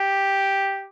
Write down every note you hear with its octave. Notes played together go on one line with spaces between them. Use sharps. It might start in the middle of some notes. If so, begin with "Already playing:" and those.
Already playing: G4